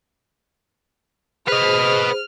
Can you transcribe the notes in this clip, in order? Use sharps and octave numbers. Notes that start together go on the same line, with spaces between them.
G#4 B4 C5 D#5 F6